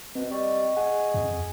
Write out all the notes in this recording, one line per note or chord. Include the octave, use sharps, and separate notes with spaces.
B2 C4
G3 D#5 C#6
G#4 F#5
F2